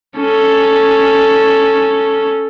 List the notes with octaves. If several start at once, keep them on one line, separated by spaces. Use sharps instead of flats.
C#4 A4